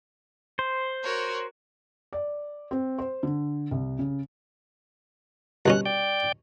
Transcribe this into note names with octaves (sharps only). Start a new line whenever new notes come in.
C5
F#4 A#4 C#5
D5
C4
C5
D3
C2
C#3
C2 B2 C#4 F#6
D5 G5